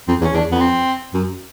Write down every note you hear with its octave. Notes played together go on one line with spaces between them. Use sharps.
F2 C4
E2
C#4
E2 D4
F2 B3
C4
F#2